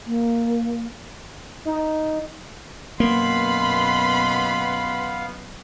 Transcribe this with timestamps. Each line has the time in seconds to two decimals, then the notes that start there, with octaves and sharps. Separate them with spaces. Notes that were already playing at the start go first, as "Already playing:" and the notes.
0.06 A#3
1.65 D#4
3.00 F#2 B2 A#3 B3 B4 F5 B5 C6